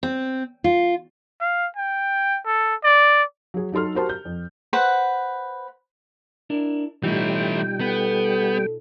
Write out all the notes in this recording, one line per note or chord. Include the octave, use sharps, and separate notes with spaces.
C4
F4
F5
G5
A4
D5
F#3 G#4
F#3 D#4 A4 C6 F6
F#4 G4 A#4 C5 A5 C6
G6
F2
B4 C5 F#5
D4 E4 A#4
B2 E3 G3 A3 D#4 F4 G5
B3 A4